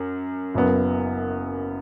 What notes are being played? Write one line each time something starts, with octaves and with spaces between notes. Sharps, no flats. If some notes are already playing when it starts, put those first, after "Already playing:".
Already playing: F#2
F#1 F#2 F#3 B3